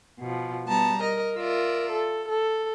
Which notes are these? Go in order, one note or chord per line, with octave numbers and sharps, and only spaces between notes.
B2 F3
G3 B3 A5 A#5
A#4 D#5
F4 A#4 D5 E5
A4
A4